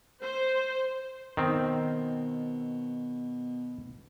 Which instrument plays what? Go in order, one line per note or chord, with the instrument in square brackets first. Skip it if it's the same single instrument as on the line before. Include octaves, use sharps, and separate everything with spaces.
[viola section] C5
[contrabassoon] B2 [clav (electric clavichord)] D#3 C4